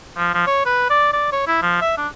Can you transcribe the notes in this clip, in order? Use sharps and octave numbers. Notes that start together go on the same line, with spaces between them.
F3
F3
C#5
B4
D5
D5
C#5
E4
F3
E5
D4